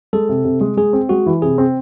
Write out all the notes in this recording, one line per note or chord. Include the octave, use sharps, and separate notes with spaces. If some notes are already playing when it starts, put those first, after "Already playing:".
G#3 A4
C3
C3
G#3
G#3 G#4
C4
G#3 F#4
E3
C3 G#4
C4